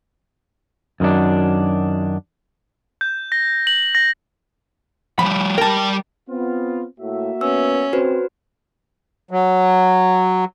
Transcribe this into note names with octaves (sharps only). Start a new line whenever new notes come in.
F#2 D#3 F#3 D4
G6
A#6
F#7
A#6
F3 G3 B5
G3 A#4 G5 A5
B3 C4 F4
A2 A#3 F#4 E5
B3 C#4 E6
C4 F#4 B4 C5
F#3